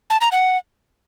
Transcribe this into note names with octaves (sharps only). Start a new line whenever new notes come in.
A5
A#5
F#5